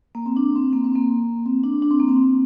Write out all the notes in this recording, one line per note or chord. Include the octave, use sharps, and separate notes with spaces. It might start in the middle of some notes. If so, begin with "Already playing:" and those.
A#3
C4
D4
C4
A#3
C4
A#3
C4
D4
D4
C4
A#3
C4